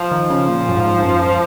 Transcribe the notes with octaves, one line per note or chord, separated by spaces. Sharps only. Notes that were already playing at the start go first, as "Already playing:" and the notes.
Already playing: F3
D#3
C#3
A#2
F#2
G#2
G#2
F#2